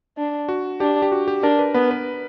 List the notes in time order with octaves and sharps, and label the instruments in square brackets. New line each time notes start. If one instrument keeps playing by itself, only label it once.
[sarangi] D4
[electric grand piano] F#4
[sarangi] D4 [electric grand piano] G4
[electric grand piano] G4
F#4
G4
[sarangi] D4 [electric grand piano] A#4
[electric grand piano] B4
[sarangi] B3 [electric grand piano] B4
[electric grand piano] B4